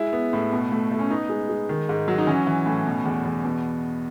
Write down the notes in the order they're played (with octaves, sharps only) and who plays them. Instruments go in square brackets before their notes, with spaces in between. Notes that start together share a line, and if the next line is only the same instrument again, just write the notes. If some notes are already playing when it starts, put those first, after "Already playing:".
Already playing: [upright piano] G#3 E4
B3
A2
B2
A3
A3
C#4
B3 D#4
G#3
G#3
D#3
G#2
F#3
D#4
E3 C#4
E3
A2
B2
E2
E2
B2